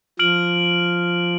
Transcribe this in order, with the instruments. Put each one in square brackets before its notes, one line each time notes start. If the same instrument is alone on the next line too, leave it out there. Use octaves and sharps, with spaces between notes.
[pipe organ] F3 [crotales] F6 D7 F#7